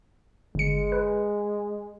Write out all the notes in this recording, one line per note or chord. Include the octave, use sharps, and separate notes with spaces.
G1 G#3 C#7
B4